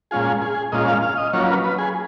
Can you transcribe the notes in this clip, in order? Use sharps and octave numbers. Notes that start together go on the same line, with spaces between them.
A#2 G#3 C#4 F4 G#4
G#4
A#2 G#3 C#4 F4 D#5
F5
F5
D#5
F#3 A#3 C#4 F4 C#5
B4
B4
G#4